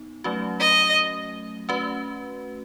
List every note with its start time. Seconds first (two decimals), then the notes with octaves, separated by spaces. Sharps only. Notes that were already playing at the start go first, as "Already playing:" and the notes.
Already playing: B3 D#4
0.24 F#3 A3 C#4 F#4
0.61 D#5
1.69 A3 C#4 F#4 B4